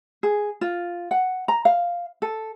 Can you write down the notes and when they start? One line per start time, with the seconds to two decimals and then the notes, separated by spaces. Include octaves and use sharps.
0.23 G#4
0.61 F4
1.11 F#5
1.48 A#5
1.65 F5
2.22 A4